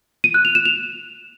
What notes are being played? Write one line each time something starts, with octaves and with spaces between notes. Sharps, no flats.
D#7
F#6
F7
E7
F7